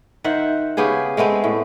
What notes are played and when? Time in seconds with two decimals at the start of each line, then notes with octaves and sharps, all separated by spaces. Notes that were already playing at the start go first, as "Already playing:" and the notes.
0.24 D#3 C5 E5 F#5
0.77 C#3 B3 G4 G#4
1.17 G#3 A3 B3 C4
1.44 A2